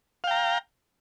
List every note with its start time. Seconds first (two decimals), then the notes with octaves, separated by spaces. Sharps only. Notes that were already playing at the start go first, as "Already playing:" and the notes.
0.24 F5
0.27 G5
0.31 A#5